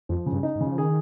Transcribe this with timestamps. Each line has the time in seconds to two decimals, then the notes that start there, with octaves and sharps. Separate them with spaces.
0.09 F2 F3
0.26 C#3
0.32 G2
0.43 D#4
0.55 G#2
0.61 C#3
0.66 F3
0.78 D#3 G#4